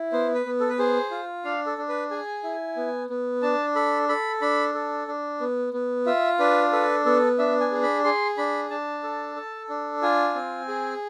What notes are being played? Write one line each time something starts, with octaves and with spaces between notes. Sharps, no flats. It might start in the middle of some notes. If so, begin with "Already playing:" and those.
Already playing: E4
B3 C5
B4
B3
A4
B4
G#4 C5
F4
D4 F5
A4
D4
B4
G#4 G#5
E4
B3
B3
D4 A5
A4 B5
A4 B5
D4 B5
A4
D4
B3
B3
F4 E5
D4 B4
A4 B4
B3 A4
D4 E5
G#5
G#4
B5
G#4 C6
D4 B5
D4 A5
A4
A4
D4
F4 G#5
C4
G#4